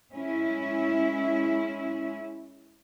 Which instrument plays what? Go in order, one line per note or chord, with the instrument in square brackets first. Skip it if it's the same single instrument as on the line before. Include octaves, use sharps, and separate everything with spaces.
[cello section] G#3 C#4 E4